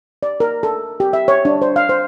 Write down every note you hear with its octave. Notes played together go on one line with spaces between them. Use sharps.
D5
A#4
A4
G4
E5
C#5
D4
C5
F5
C5